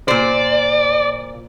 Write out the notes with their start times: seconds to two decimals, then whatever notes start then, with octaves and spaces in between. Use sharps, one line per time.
0.08 A#2 C5 D5